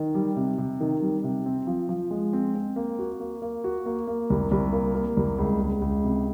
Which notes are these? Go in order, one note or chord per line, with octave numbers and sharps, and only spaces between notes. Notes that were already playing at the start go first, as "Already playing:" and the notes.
Already playing: D#3
G3
C3
C3
D#3
G3
C3
C4
F3
F3
G#3
C4
C4
A#3
F#4
A#3
A#3
F#4
A#3
A#3
C2
C2
A#3
A#3
C2
C#2
C#2
C#2
C3